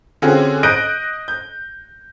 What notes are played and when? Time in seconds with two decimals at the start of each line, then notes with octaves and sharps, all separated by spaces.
0.22 D3 C4 C#4 F4 F#4 G#4
0.63 D#5 F#6 G6 A#6 D7 D#7
1.28 G6